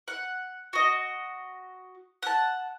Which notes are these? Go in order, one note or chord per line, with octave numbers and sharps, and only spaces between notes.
F#5
F#4 D#5
F#5 A5